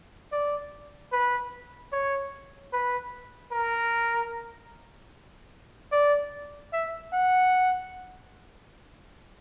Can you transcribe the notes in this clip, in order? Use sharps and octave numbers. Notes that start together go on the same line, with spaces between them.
D5
B4
C#5
B4
A#4
D5
E5
F#5